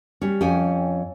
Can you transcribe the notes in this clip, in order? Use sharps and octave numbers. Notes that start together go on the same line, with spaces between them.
G3 C#4
F2 C#4 C#5 G5 G#5